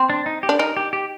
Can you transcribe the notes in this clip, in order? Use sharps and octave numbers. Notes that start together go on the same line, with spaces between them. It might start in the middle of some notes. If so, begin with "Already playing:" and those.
Already playing: C4
D4
D#4
G4
D4
D#4 A#4
G4
G4